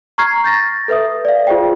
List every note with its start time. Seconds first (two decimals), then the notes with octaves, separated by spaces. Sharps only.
0.18 A#5 C#6 F6 G#6 C7
0.44 G6 A6 A#6
0.88 A4 B4 E5 D#6
1.25 D5 F5
1.47 F4 G#4 C5 G5